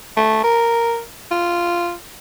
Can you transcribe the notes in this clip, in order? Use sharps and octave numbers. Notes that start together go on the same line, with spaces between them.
A3
A#4
F4